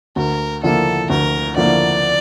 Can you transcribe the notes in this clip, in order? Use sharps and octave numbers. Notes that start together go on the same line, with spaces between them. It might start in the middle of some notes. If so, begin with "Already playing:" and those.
D2 A#4
D3 F3 A#3 E4 A4
D2 A#4
D3 F3 A#3 E4 D5